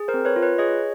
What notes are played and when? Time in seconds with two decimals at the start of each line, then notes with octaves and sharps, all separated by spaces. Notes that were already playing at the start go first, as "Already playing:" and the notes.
Already playing: G#4
0.08 A#4 C5
0.14 C4
0.25 B4 C#5
0.36 F4
0.43 B4 C#5
0.58 G#4 C#5 D#5